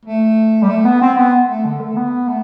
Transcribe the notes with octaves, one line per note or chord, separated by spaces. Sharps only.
A3
G3
A3
B3
C4
B3
A3
D3
A3
B3
A3